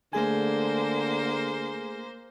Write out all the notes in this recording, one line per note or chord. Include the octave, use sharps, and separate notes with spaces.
D3 A3 A#3 G#4 C5 G#5